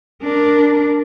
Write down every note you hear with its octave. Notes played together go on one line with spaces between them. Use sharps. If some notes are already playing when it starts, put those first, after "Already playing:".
D4 A#4